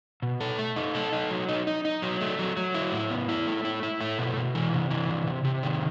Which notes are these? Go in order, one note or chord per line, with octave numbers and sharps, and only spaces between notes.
B2
A4
A3
D#4
A4
D#4
F#3
D#4
D#4
D#4
F#3
A3
F#3
F#3
E4
A2
B3
E4
A3
E4
E4
A3
B2
B2
E3
C3
E3
C3
C3
C3
D#3